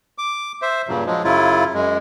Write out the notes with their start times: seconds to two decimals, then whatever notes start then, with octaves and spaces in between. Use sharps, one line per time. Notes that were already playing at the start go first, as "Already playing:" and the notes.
0.18 D6
0.62 C5 E5
0.88 G2 A#2 C#3 F#3
1.06 F3 F#3 G#3
1.24 F#2 C#3 F#3 E4 F4
1.74 F#2 G#3